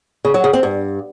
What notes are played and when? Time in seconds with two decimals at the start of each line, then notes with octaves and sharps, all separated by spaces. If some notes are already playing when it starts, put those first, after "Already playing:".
0.25 C#3
0.34 F#3
0.44 C#3
0.53 C4
0.63 G2